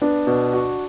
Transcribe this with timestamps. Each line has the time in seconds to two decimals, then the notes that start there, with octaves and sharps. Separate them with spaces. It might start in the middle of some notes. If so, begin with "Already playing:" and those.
0.02 B3 D4
0.27 B2
0.53 F#4